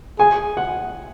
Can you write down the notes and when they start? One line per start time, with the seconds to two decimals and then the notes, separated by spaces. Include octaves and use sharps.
0.19 G#4 G#5
0.57 F#5